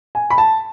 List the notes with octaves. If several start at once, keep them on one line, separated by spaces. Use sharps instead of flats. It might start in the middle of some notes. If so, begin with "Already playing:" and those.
G#5
B5
A5